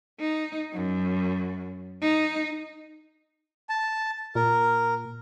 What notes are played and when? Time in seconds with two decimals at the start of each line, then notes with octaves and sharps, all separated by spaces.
0.20 D#4
0.73 F#2
2.01 D#4
3.69 A5
4.35 A#2 A#4